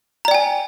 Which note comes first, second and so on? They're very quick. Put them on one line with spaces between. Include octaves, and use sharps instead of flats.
A#5 D5 G5 G#5